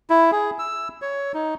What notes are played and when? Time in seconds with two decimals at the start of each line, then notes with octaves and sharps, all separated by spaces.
0.10 E4
0.32 G#4
0.59 E6
1.02 C#5
1.34 D#4